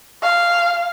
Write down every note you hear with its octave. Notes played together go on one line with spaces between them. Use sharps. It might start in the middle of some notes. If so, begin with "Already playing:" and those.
F5